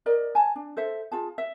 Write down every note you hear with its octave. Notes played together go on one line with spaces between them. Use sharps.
A#4 D5 D#5
G#5 A5
D4
A4 C5 E5
F4 G#4 A5
E5